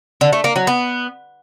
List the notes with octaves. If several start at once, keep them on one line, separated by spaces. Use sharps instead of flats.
D3
A3
A#3
F#3
B3